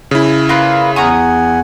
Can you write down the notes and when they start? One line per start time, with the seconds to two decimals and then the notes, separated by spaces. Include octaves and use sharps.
0.11 C#3 E4
0.49 A#3 F4 B4
0.96 E2 F#5 G#5 A#5 C#6 D#6